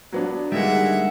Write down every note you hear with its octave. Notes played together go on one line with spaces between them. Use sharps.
F#3 B3 D4
D3 D#3 G3 G#3 A#3 G#4 E5 F#5